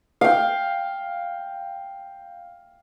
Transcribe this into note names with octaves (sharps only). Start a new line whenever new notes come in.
F5 G5